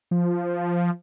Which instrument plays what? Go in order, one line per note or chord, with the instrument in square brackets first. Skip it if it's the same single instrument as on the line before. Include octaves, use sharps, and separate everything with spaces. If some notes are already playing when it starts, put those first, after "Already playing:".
[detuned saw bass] F3